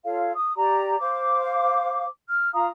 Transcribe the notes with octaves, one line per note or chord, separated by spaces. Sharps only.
F4 A4 C#5 F5
D#6
G4 D5 A#5
C5 F5 D6
F6
F4 F5 A#5 D#6